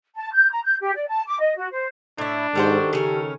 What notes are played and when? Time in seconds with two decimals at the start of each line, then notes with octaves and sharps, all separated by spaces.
0.16 A5
0.33 G6
0.51 A#5
0.63 G6
0.81 G4
0.95 D5
1.07 A5
1.26 D6
1.39 D#5
1.56 F#4
1.71 C5
2.18 A2 D4 E4
2.55 G#2 D#3 G3 F#4 A4 C5
2.93 C#3 C#4 G4 A#4